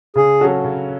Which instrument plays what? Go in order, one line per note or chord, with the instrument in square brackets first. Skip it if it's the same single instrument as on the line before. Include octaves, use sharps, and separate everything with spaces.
[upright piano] C#3 [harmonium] G#4
[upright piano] F#3 C#4 F#4 A4
C#3